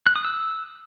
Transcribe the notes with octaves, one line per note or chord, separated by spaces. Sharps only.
F#6
D#6
E6